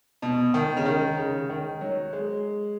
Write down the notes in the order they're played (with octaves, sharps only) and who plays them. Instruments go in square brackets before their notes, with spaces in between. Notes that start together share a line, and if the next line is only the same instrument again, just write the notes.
[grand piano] B2
D#3
C#3
D#3
C#3
D#3
F#3
G#3